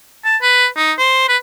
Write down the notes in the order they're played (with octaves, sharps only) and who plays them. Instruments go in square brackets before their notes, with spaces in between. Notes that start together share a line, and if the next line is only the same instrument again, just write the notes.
[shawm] A5
B4
D#4
C5
B4